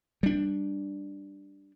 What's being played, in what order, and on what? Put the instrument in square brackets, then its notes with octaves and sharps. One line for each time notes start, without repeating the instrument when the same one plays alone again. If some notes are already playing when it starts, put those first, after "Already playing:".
[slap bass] G3 D4